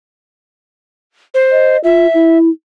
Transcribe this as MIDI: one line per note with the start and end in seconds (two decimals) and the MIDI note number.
1.34 1.77 72
1.51 1.82 75
1.84 2.07 65
1.84 2.38 76
2.14 2.49 64